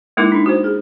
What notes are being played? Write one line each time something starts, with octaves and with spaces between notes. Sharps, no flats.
G#3 A#3 D#4 E4 A#4 D6
D4 D#4
F#4 C5
G#4